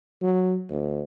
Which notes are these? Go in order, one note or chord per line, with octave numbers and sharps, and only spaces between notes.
F#3
D2